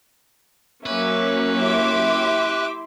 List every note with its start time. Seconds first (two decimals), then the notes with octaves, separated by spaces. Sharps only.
0.86 F#3 A#3 C#4 B4 E5 D6
1.56 E4 G4 E5 C6 D6